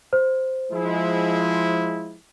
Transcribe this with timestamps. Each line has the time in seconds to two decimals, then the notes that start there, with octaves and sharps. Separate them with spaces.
0.13 C5
0.72 F3 G#3 E4